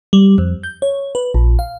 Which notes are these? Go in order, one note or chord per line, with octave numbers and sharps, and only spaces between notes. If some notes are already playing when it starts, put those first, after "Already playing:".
G3
F2
G6
C#5
B4
A#1
F5